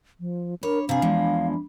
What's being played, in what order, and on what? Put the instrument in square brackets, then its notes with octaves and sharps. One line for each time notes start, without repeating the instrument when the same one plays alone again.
[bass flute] F3
[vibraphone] D4 B5 [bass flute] A#4 [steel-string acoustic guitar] C#5
[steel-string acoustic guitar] C3 G#4 [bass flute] F5
[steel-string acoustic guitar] E2 F3 G#3